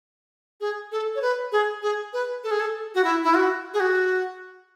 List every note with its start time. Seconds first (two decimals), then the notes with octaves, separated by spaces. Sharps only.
0.61 G#4
0.92 A4
1.15 C#5
1.22 B4
1.52 G#4
1.82 G#4
2.13 B4
2.44 A4
2.51 G#4
2.60 A4
2.95 F#4
3.04 E4
3.24 E4
3.34 F#4
3.74 G#4
3.80 F#4